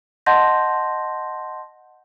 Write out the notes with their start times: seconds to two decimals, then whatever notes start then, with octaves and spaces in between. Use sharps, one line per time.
0.26 D#5 F#5 A5 C6 G6 A#6